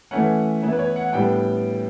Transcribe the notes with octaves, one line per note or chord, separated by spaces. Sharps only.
E3 A3 C#4 F#5
E3 B3 E4 E5
B4
C#5
F#5
F#5
A2 G3 B3 D4 G5